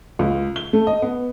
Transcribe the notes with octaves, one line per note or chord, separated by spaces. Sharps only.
C#2
G7
A3
D#5
B3